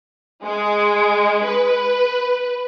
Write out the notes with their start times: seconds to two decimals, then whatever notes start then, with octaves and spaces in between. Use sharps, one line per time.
0.44 G#3
1.46 B4